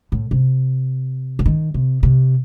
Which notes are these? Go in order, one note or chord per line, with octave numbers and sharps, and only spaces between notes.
A2
C3
C#3
D#3
C3
C3